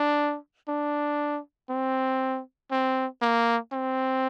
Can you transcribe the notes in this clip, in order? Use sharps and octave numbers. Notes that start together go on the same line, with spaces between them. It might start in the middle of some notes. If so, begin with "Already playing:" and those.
Already playing: D4
D4
C4
C4
A#3
C4